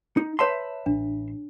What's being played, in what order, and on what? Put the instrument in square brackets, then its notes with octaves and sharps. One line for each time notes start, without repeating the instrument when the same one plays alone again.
[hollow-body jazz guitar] D#4
[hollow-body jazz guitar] B4 E5 C6 [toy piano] C#5 A5
[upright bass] A1 [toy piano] D4